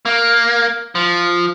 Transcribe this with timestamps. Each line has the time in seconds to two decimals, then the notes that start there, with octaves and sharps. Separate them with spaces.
0.05 A#3
0.95 F3